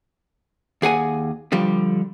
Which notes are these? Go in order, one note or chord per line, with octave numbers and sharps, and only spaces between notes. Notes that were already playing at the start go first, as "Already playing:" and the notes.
D#2 G#4 F#5 G#5
D3 F3 G3 G4